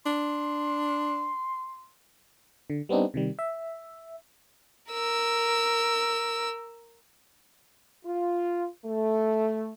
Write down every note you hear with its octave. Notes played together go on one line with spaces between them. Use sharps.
D4 C6
D3
G3 B3 C4 D4 D#4
C3 D#3 G3
E5
A#4 E6
F4
A3